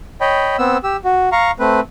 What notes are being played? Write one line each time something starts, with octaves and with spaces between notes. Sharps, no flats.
C#5 D#5 G5 B5
B3 C4 E6
G4 E6
F#4
F5 A#5 C#6
A3 C4 B4